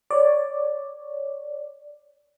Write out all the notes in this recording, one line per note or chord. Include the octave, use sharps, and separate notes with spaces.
C#5 D5